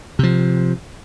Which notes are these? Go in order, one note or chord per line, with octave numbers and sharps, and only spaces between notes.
C3 F3